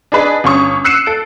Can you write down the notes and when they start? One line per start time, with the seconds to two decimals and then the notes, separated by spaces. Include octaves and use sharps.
0.12 D4 D#4 G#4 B4 D5
0.44 G1 C#4 C#6 D#6
0.84 E6 F#6 C7 C#7 D#7 E7
1.06 A4 F#6 D7